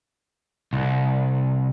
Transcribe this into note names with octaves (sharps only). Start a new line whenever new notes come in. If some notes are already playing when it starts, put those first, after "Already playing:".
C2